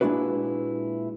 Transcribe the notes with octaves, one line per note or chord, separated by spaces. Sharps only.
A#2 G#3 D4 E4 F#4 B4